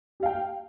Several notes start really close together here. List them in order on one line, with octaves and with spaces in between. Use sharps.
G4 F5 G5